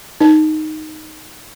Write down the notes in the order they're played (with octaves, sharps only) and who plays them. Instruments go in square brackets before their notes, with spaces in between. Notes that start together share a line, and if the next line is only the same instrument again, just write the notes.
[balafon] D#4